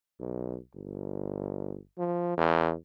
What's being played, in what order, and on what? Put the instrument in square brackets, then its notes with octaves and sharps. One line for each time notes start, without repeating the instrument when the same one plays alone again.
[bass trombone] B1
G1
F3
E2